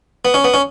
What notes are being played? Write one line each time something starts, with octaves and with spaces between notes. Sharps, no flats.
B3
C#4
B3
C#4